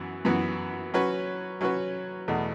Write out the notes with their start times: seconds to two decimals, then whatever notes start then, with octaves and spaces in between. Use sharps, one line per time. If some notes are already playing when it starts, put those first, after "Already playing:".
Already playing: F#2 E3 B3 F#4
0.25 F#2 E3 B3 F#4
0.94 F#3 C#4 F#4 B4
1.61 F#3 C#4 F#4 B4
2.28 E2 B2 A3